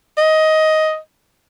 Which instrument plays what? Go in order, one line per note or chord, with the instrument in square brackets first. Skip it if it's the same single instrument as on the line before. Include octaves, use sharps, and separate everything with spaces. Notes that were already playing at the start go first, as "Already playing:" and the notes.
[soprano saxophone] D#5